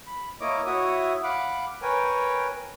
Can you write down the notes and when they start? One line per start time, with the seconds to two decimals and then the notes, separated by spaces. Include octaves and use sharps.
0.07 B5
0.41 A#3 E4 C#5 D#5 D6
0.66 E4 F#4 C#5 E5 D#6
1.23 F5 F#5 B5 D6
1.82 A#4 B4 C#5 G5 G#5